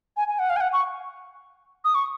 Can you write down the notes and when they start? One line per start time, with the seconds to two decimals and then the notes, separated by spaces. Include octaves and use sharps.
0.17 G#5
0.28 G#5
0.39 F#5
0.50 F5
0.56 G#5
0.61 F#5
0.73 C#6
1.85 D#6
1.95 C#6